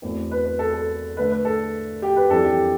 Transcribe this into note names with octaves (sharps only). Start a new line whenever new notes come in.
E2 B2 A3 C4
B4
B4
A4
A4
D3 A3 D4 B4
B4
A4
G4
B4
F2 E3 G3 D4 A4
G4